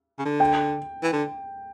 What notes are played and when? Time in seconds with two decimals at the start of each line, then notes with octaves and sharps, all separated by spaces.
0.19 C#3
0.25 D3
0.40 G5
1.03 E3
1.13 D3